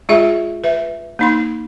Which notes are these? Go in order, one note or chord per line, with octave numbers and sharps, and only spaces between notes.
G#3 F4 G#4 E5
B4 E5
A#3 D#4 C6